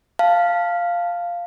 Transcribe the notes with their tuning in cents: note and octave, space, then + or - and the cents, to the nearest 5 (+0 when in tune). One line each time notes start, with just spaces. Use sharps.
F5 -5 A5 +0